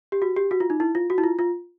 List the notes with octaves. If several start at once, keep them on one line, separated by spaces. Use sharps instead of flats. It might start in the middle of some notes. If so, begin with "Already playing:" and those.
G4
F#4
G4
F#4
F4
D#4
E4
F4
F#4
E4
F4
F4